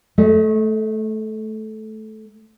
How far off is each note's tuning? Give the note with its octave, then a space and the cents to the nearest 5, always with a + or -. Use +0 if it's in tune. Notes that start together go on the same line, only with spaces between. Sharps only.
A3 -15 D#5 +40